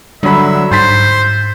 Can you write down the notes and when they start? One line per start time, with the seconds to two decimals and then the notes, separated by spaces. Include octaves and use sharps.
0.23 D3 F#3 G3 E5 B5
0.71 G#2 C5 C6 A6 B6